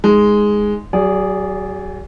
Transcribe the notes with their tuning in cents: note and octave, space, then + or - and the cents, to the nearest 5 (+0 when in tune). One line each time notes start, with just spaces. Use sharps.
G#3 +0 D#4 +0
F#3 +35 G#4 -10 D5 -20